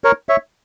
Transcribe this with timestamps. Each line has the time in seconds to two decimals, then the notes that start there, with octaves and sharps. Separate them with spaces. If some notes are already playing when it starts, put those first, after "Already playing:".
0.04 A#4 C#5
0.29 C#5 E5